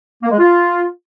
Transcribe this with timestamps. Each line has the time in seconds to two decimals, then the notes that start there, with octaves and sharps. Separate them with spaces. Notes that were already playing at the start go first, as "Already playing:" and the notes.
0.23 A#3
0.31 G#3
0.39 F4